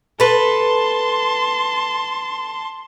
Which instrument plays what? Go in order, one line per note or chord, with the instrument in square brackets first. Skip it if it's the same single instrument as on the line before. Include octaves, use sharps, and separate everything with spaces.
[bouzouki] A4 B4 [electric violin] A5 C6